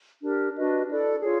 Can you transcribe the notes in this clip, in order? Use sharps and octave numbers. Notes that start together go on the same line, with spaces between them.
D4 G4 A#4
D4 F#4 B4 D#5
E4 A4 D5
F4 G#4 C#5